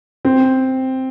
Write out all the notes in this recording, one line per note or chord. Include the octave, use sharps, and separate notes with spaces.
C4